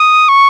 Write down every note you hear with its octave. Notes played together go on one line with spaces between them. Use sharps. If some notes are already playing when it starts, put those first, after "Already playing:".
Already playing: D#6
C#6